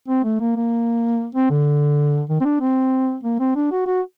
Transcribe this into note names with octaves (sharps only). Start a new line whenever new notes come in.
C4
A3
A#3
A#3
C4
D3
D#3
C4
D4
C4
A#3
C4
D4
F#4
F#4